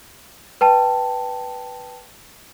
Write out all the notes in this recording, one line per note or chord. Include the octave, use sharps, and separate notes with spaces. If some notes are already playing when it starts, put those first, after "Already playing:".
B4 G5 A5